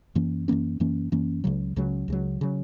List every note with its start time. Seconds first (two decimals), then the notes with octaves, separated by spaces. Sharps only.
0.15 F#2 E3 A#3 C#4
0.48 F#2 E3 A#3 C#4
0.80 F#2 E3 A#3 C#4
1.12 F#2 E3 A#3 C#4
1.44 C#2 C#3 F#3
1.76 C#2 C#3 F#3
2.08 C#2 C#3 F#3
2.41 C#3 F#3